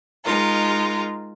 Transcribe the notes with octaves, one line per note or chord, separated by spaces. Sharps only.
G#3 D#4 F4 A#4